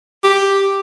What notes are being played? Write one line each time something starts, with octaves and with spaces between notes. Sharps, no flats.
G4